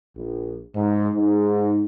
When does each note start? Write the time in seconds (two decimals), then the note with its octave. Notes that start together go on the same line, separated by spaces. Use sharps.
0.16 A#1
0.76 G#2
1.15 G#2